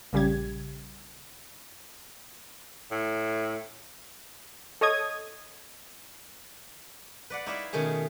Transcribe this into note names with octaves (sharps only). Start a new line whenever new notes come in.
A#1 C#3 G3 G4 G#6
A2
A4 C#5 D#5 D#6 G#6
B4 D5 F#5
D#4 E4 C#5 D5 E5 F5
B2 D#3 A3 C#4 G#4